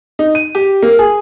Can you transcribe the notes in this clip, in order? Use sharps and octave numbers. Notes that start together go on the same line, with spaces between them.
D#4
D#7
G4
A#3
G#4